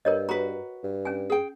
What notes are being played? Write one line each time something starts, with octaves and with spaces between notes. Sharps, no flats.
G2 A#4 C#5 D#5
F#4 B4 A#5
G2
C#4 G#5
G#4 G5